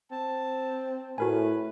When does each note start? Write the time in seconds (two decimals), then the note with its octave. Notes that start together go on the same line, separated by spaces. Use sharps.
0.11 C4 A5
1.18 A2 F#4 A#4 B4 G#5